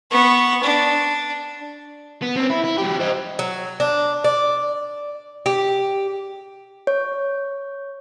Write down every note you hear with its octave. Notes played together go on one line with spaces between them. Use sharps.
B3 C#6
D4
B3
C4 C#4
E4
E4
F#3 G4
C5 D#5
F#3
D4
D5
G4
C#5